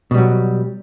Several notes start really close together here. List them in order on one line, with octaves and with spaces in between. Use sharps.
B2 G3 F#3